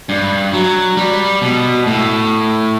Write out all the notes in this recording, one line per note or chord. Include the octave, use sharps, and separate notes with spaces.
G2
F#3
G3
B2
A2